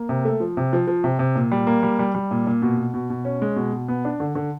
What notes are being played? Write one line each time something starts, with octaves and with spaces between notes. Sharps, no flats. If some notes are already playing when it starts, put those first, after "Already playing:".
Already playing: A#3
C3
A3
F3
C3
F3
F3
C3
C3
A#2
G3
A#3
G3
G3
G3
A#2
A#2
B2
B2
B2
B2
C#4
G#3
B2
B2
B3
D4
D3
D3